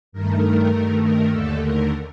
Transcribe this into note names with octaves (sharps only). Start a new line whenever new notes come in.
G2 D#3 A3 A#4
G2 D#3 A3
A#4
D#2 D3 A3 A4
A#4